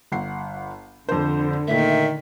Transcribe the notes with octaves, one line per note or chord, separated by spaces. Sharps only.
G1 F#5 C7
F2 D3 C5
A#2 D#3 A3 E5